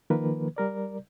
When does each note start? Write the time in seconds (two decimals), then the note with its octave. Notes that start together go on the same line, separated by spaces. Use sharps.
0.10 D#3 F3 A#3 A#4 B4
0.56 G3 A#4 D5